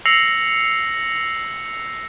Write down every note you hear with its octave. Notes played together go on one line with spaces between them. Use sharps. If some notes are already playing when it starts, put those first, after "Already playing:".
E6 A#6 C7 C#7 F7 F#7